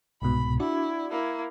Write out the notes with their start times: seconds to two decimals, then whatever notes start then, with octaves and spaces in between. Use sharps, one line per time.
0.22 C2 G#2 B2 B5
0.60 D4 E4 F#4 D5
1.11 A#3 E4